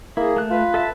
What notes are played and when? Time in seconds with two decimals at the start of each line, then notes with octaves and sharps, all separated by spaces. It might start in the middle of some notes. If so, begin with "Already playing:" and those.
0.17 A#3 E4 G#4
0.36 A3 F#6
0.50 F4 B4
0.74 A4 E5 A5